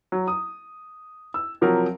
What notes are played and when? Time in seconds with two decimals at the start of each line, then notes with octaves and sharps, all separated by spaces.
0.12 F#3
0.28 D#6
1.34 E6
1.61 C3 F3 F#3 A#4